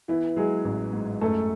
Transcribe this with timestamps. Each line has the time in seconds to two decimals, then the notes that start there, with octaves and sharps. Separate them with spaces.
0.08 E3 B3 E4
0.37 F#3 G#3 G#4
0.65 A1
0.93 G#2
1.21 F#2 A3 A4